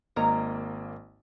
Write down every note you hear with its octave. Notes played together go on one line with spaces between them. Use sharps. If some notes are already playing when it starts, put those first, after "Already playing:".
G#1 A#3 A#4 C#5 D#5 A#5